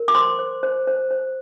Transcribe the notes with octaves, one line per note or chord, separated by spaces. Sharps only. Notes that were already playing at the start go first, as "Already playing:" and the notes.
Already playing: A#4
D6
C5 C6
C5
C5
C5
C5